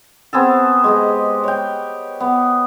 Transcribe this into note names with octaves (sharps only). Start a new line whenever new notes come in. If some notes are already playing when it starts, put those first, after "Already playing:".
B3 C4 G#4 A4
G#3 G4 D#5
C#5 G5
B3